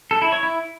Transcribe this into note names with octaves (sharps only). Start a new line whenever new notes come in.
A4
E4
C#5
E4